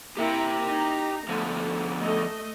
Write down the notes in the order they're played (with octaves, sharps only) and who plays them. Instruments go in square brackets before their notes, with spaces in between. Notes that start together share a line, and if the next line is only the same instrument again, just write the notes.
[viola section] A#3 E4 A#5 [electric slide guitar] G4 E5 G5
[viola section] D#4 A#5
[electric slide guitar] D3 F3 B3 [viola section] A3
[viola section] A3 D#5